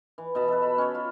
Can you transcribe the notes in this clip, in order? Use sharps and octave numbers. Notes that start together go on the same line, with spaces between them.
E3
B2 D#5 A5 B5
A4 B4
A4 B5
C#4 C#5
F4